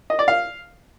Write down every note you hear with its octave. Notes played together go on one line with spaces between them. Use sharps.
D#5
D5
F5